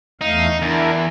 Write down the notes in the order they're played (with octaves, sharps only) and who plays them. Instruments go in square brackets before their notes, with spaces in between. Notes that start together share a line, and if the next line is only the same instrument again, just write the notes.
[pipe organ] E2 A3 F5 [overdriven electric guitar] D#4
[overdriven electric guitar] E2 [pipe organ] D4 E4 A#4